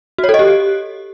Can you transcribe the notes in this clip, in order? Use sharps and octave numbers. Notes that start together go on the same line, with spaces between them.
F#4
C#5
A4
D#5
G4